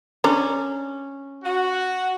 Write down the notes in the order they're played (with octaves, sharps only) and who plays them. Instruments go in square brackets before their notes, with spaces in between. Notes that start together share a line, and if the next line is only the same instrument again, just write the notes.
[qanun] C#4 [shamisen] D4 D5 A#5
[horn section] F#4